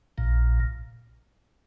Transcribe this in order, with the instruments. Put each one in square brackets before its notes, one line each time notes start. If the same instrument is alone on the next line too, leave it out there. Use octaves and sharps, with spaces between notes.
[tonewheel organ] A#1 A#2